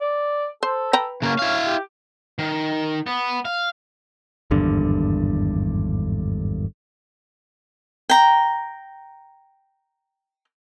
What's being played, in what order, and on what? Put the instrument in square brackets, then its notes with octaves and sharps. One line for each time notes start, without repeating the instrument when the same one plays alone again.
[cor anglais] D5
[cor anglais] A4 [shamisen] C5
[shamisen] B4 G5 A#5
[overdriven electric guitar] C#3 A#3 [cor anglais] C#4
[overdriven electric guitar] E4 F5
[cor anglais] G4
[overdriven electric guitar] D#3
B3
F5
[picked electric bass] G#1 E2 G2 D3
[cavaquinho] G5 A#5